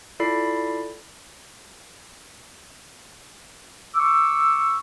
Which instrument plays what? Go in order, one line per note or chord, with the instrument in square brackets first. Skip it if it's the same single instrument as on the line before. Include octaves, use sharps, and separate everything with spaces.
[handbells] E4 F4 A4 D5 B5 C7
[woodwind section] C#6 D6 E6